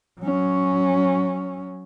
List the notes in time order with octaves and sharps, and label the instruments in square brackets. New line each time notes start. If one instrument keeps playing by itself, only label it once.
[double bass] F#3 C#4